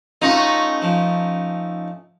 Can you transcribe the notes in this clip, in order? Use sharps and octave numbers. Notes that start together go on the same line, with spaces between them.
A3 C#4 D#4 F4 F#4
F3